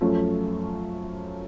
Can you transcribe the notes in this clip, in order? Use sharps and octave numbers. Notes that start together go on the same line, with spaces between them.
F#2 F3 A3 C#4